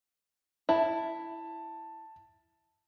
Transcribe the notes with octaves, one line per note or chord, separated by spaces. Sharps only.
E4 A5